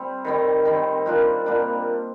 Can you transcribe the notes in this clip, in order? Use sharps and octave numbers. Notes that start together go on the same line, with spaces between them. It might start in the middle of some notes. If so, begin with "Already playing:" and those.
Already playing: G3 C4
D#3 G3 C4
D#3 G3 C4
A#2 G3 A#3 D4
A#2 G3 A#3 D4